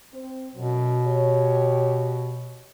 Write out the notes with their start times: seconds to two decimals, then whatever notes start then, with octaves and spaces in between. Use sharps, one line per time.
0.13 C4 C5
0.55 F#2 B2 F#3
1.06 G4 C#5